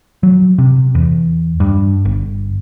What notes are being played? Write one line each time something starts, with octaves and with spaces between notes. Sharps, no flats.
F#3
C3
E2
G2
G1